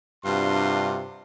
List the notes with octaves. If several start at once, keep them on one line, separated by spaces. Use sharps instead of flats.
G2 C3 D4 F4 F#4 C6